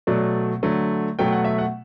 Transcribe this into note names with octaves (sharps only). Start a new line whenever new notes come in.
B2 F#3 A3 D5
D3 F#3 A3
B2 F#3 A3 G5
F#5
E5
F#5